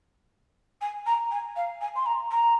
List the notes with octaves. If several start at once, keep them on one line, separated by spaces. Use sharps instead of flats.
G#5
A#5
G#5
F5
G#5
C6
A#5
A#5